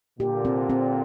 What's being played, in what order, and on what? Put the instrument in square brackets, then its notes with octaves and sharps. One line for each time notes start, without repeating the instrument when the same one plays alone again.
[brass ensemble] A#2 D3 [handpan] G4
[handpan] C4
C4